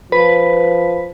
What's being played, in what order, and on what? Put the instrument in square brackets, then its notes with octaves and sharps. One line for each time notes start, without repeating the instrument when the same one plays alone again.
[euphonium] F3 [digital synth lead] B4